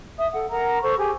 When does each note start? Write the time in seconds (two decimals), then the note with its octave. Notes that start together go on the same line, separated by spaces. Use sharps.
0.18 E5 D#6
0.32 A4 F#5
0.51 A#4 F#5 A#5
0.83 A4 C5 C#6
0.98 G4 G#4 G#5